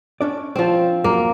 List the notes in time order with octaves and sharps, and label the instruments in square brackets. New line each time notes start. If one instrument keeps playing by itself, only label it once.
[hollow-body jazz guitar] C#4 D4 D5
[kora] F3 C4
[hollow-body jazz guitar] F#2 [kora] A#3